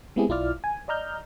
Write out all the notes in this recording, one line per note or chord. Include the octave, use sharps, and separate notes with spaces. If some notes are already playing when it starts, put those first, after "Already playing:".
G#3 B3 C4 E4 G4 G#4
B1 E4 F4 D5 F6
G#5
D5 D#5 A#5 F6 G6